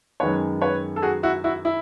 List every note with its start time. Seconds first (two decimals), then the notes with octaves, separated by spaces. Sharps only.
0.20 F#2 D#3 G#3 B3 B4 C#5
0.61 B4 C#5
0.96 A4
1.02 F#4 G#4
1.23 E4 F#4
1.44 E4 F#4
1.65 E4